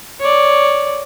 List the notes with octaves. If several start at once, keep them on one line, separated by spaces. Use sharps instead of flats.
C#5 D5